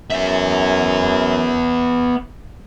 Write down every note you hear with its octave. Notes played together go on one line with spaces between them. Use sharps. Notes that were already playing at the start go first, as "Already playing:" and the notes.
F#2 B3 E5